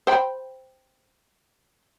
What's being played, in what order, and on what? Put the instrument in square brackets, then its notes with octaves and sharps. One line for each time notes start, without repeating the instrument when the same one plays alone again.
[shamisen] C5 G5 B5